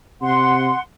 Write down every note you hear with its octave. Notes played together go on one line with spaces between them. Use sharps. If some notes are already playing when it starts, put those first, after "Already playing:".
C3 F#5 C6